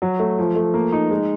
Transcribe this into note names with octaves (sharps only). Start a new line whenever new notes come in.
F#3
A3
F3
A3
A#3
D#4
G#3